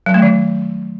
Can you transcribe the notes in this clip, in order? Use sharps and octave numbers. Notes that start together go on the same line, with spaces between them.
F#3
A3
D#3